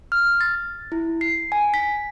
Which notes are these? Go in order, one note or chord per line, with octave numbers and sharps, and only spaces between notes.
F6
A6
E4
C7
G#5
B6